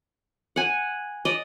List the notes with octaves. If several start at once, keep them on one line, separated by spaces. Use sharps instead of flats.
F#5 G#5
D5 D#5